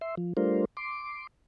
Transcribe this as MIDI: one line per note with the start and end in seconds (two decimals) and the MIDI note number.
0.01 0.15 76
0.01 0.15 84
0.17 0.33 53
0.37 0.65 55
0.37 0.65 57
0.37 0.65 62
0.37 0.65 65
0.37 0.65 70
0.37 0.65 72
0.77 1.27 84
0.77 1.27 86